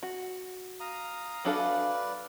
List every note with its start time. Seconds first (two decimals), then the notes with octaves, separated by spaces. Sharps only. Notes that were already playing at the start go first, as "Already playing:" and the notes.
0.03 F#4
0.80 F5 A#5 D#6
1.45 F#3 D4 A4 B4 D5 E5 F5 G#5